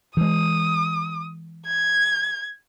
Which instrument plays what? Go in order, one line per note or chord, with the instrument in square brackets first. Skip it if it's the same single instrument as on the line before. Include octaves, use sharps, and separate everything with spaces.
[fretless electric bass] E3 G#3 [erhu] D#6
[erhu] G#6